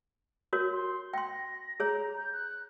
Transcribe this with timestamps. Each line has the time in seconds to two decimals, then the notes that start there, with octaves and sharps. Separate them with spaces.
0.53 F#4 A#4 C#5
0.72 C6
1.14 G5 C6 A#6
1.80 G#4 C#5 A#5
2.17 G6
2.33 F#6